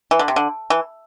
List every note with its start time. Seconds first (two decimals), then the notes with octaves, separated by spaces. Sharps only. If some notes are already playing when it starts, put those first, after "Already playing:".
0.11 E3
0.19 D3
0.28 C3
0.36 D3
0.70 E3